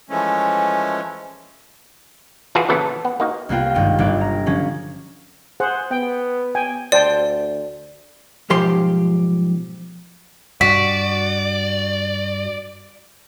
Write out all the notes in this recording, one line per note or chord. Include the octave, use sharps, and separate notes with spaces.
E3 F3 G#3 A3 C#4
E3 F4 F#4 G#4 B4 A5
A#2 C#3 E3 B3 A4
B3
A#3 D#4 F#4
C2 A#3 B3 F4 G5
G#1 G2 G5 D#7
G1 F#3 B3 D5 D7
A#5
D3 F3 F#3 C#4
G#4 C5 F#5
B3 G5
G5 G#5
D2 C5 D5 G5 A5
B1 G#2 F3 G4 C6
G2 F#4 D5 B6